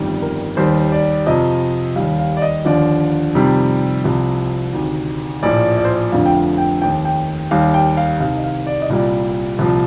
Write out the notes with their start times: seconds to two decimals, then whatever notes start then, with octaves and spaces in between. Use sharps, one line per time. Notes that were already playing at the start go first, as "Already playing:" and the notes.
Already playing: G1 F2 D#3 G3
0.22 A#4
0.57 D#2 D#3 G3 C5
0.92 D5
1.26 F2 C3 F3 D#5
1.96 D#2 D#3 G3 F5
2.19 F5
2.37 D5
2.42 D#5
2.65 D#2 D3 F3 D5
3.35 F2 C3 D#3 G3
4.04 C2 C3 F3
4.73 D2 C3 D#3
5.43 A#1 A2 F3 D5
5.77 D5
5.85 C5
5.93 D5
6.12 F1 F2 D3 F3 F5
6.26 G5
6.35 F5
6.58 G5
6.82 F1 D#2 D#3 G5
7.05 G5
7.51 D#2 D#3 G3 F5
7.74 G5
7.97 F5
8.20 C2 C3 D#3 F5
8.37 D#5
8.44 F5
8.67 D5
8.82 D#5
8.90 C2 A#2 G3 D5
9.59 C2 A#2 F3